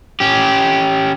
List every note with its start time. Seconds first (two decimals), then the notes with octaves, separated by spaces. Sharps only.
0.20 C#4 G4